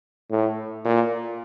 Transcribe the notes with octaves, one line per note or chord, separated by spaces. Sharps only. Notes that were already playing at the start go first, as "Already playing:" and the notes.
A2
A#2